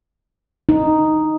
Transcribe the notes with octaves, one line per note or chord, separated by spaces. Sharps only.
D#4